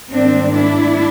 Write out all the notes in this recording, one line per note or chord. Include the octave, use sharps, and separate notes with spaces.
G#2 D#3 G3 A#3 C4 D4
D4 E4